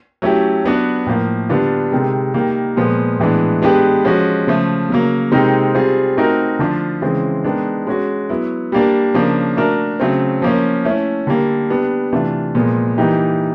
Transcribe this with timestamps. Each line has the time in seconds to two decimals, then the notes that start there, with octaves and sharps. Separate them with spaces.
0.22 F#3 A3 C#4 E4 G4
0.64 F#3 B3 D4 F#4 B4
1.06 A2 F3 A#3
1.49 D3 G3 B3 D4 F4
1.92 C3 D#3 G#3
2.34 D#3 G3 A#3
2.77 A#2 F3 G#3 B3
3.19 A2 E3 G#3 B3 D4
3.62 G#3 B3 D4 G4 B4
4.05 F3 G#3 C#4 F#4
4.47 C#3 F3 A3
4.90 C#3 F#3 A#3
5.32 C3 D#3 G#3 C4 D#4
5.75 G3 C4 F4 G#4
6.17 A3 C4 D#4 F#4 A#4
6.59 D3 F3 A3 D4 F4
7.02 C#3 E3 G#3 C4
7.44 D#3 G#3 B3 D4
7.87 G#3 C#4 F#4
8.29 F#3 B3 E4
8.72 G3 A#3 D4
9.14 C#3 F3 A#3 D4
9.57 A3 D4 F#4 A#4
10.00 C#3 F#3 A3 C4
10.42 F3 A#3 C#4
10.85 A3 C#4 E4
11.27 D3 G3 A#3
11.70 G3 B3 D4
12.12 C3 E3 A3 D4 F4
12.55 A#2 F3 G#3 B3
12.98 E3 G3 A#3 D#4 G4